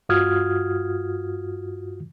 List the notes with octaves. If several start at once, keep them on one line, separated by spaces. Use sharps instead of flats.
G2 F4 F#4 D#6 F6 G#6